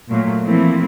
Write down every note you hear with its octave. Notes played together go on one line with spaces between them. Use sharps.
A#2 F#3 A3
E3 F3 A3 A#3 C4 E4